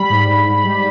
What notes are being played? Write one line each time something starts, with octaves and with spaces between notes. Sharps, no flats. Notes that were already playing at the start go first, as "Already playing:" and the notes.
Already playing: G3 B5
G#2
G#2
G#2
G3